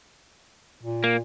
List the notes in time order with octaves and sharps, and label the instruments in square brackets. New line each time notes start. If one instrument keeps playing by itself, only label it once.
[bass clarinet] A#2
[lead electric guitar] A#3